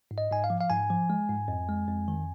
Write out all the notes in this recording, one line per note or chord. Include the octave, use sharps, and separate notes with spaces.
G#2
D#5
G#2 G#5
F5
F3
F5
G#2 G#5
F3
G#3
G#2
F2
G#3
F2
D#3